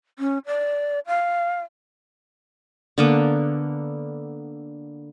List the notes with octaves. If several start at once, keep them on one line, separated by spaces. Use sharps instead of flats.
C#4
D5
F5
D3 A#3 B3